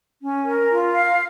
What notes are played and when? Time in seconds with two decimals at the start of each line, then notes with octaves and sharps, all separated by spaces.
0.21 C#4
0.45 A#4
0.68 F4
0.92 F5